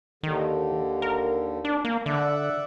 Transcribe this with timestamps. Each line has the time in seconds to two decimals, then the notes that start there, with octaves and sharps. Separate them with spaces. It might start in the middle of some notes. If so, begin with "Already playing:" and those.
0.23 D#2 D3 D#3
1.02 A#4
1.65 D4
1.85 A#3
2.06 D3 D5 E5 F#5